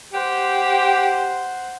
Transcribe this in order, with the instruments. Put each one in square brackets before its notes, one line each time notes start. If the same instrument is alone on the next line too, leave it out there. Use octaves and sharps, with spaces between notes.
[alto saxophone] G4 [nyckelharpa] C5 F#5